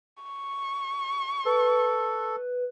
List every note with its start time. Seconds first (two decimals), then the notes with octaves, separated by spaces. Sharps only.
0.23 C#6
1.45 A4 B4